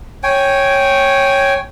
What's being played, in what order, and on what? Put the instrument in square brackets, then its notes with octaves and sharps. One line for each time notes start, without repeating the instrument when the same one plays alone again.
[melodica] C#5 G5 G#5